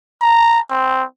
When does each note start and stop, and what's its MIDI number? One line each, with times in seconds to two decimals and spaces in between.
0.21 0.59 82
0.70 1.04 60